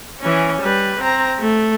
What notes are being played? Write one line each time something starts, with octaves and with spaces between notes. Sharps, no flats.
E3 C#4
G3 B4
C4 A#5
A3